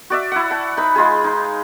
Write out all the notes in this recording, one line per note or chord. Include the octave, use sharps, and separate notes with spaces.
F#4 D5 E5
E4 F#5
F#5 A5
D#4 B4 B5
G#3 F4 G#4
D#4